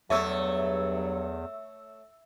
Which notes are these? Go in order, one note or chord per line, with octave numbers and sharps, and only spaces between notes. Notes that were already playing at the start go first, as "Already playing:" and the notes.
E2 G2 F#3 A3 C#5 E5 E6